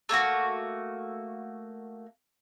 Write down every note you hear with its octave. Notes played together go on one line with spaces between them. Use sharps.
A3 A#3 F4 F#4